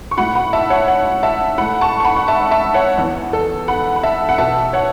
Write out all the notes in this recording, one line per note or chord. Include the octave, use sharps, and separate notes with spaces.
C#6
A2 F#3 A3 F#5 B5
F#5 B5
E5 A5
C#5 F#5
C#5 F#5
E5 A5
A2 A3 F#5 B5
A5 C#6
C#6
F#5 B5
F#5
E5 A5
E5 A5
C#5 F#5
E2 E3 B3
A4
F#5 B5
B5
E5 A5
F#5
B2 B3 E5 A5
C#5 F#5